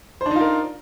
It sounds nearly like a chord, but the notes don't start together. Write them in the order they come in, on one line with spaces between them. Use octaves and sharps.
C5 D4 D#4 F4 A#4